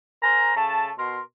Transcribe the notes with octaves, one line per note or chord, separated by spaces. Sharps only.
A#4 C5 G#5 A#5
C#3 A3 A5
B2 A#4 C6